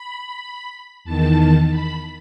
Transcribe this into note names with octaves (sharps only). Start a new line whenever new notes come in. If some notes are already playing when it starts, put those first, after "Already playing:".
Already playing: B5
E2 D#3 A5
B5